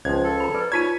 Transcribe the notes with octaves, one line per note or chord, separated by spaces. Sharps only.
C#2 F3 C5 G#6
A4
A#5 B5
B4 D5
D#4 F4 C#5 A#5 G#6 B6 D#7